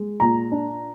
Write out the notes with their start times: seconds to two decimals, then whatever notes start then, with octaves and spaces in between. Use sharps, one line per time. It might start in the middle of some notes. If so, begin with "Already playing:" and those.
Already playing: G#3
0.20 A#2 A#5
0.52 D4